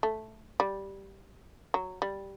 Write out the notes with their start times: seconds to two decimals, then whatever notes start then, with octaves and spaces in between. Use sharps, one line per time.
0.03 A3
0.60 G3
1.74 F#3
2.02 G3